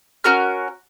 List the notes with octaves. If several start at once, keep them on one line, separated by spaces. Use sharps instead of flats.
C#4 F#4 A#4 F6